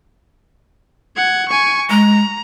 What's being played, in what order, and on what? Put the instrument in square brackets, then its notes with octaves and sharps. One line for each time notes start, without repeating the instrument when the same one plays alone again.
[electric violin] F#5 G#6
G#5 C#6
[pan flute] G#3 [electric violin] A#5